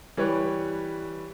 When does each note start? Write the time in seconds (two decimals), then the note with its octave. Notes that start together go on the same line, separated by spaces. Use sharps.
0.17 E3 G3 B4 C#5